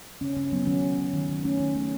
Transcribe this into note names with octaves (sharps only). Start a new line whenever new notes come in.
C#3 C#4
C#3 C#4
F#3 B3
D#3 C#4
D#3
D#3
D#3
D#3
A3 C#4
D#3
A3